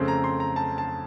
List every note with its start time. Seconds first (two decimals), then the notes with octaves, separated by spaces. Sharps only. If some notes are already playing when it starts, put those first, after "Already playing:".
Already playing: F2 C#3 A3 C4
0.08 A#5
0.24 C6
0.40 A#5
0.56 A5
0.78 A5